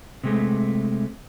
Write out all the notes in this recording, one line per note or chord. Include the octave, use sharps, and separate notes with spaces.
C3 G#3 A3